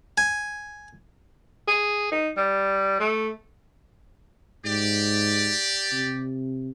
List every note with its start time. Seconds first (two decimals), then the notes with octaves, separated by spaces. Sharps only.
0.18 G#5
1.68 G#4
2.11 D#4
2.37 G3
3.00 A3
4.65 G#2 G4 D5
5.92 C3